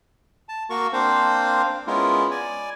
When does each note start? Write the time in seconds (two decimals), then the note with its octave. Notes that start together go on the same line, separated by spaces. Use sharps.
0.49 A5
0.70 A#3 F#4 A#4 C#6
0.93 A#3 C4 D4 C5 F5
1.87 G#3 B3 C#4 E4 F4 A#4
2.31 D5 G#5